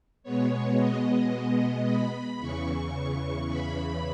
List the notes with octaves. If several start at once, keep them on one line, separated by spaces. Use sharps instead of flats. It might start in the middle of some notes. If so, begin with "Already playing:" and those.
B2 G#3 B3 C#5
D#5
B5
E2 C#3 E3 C#6
B5